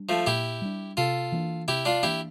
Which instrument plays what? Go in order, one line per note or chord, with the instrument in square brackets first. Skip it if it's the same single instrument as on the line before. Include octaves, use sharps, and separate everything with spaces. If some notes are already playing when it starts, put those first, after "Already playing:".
Already playing: [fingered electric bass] G3 D4
[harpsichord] F3 A3
[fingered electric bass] A#2 [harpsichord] E4 G4
[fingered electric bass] G3 D4
[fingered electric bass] C3 [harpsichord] F4 A4
[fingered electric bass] E3 A#3 D4
[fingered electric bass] C3 [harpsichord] E4 G4
[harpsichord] D4 F4
[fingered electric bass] E3 A#3 D4 [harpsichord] E4 G4